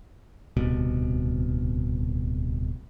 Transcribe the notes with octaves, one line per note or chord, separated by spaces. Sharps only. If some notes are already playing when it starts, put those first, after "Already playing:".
D1 C2 B2